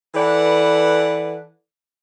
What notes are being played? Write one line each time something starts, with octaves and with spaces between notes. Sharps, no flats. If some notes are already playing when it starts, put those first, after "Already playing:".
E3 A4 B4 D5 F#5